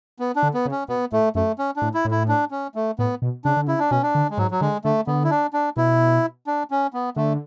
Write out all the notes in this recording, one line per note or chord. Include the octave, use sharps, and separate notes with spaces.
B3
D4
D3
B3
C#3
C#4
B2 B3
A2 A3
F#2 A3
C#4
D4
A2
E4
A2
E4
D4
C#4
A3
A2 B3
B2
C#3 D4
D3
C#3 E4
D4
B2 C#4
D4
D3
G#3
G#2 F#3
F#3
D3 G#3
D3 A3
D3 B3
E4
D4
D4
B2 E4
D4
C#4
B3
D3 A3